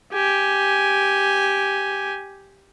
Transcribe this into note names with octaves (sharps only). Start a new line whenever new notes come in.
G4 G#5